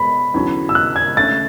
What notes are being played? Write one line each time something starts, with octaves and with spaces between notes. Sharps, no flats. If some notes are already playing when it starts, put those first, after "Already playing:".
Already playing: G#3 B3 B5
E2 D3 F#3 C#4
E6
F#6
G#6
D3 A3 C#4 A6